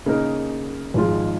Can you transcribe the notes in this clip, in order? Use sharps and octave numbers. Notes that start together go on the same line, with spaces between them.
C#3 A#3 D#4 A#4
G#1 G#2 F3 G#3 F4